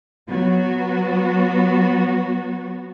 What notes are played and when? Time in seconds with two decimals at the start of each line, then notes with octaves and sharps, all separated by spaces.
0.28 F#3 B3 F#4